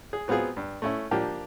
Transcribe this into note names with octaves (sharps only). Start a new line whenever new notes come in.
G#4
F#3 B3 C4 F4 G#4
G2
A3 C#4 E4
F3 A#3 D4 G4